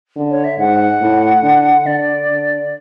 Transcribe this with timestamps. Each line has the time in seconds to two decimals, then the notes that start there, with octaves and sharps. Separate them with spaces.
0.16 D3
0.31 C#5
0.44 E5
0.59 G#2 F#5
1.01 A2
1.43 D3
1.86 D3 D5
2.28 D3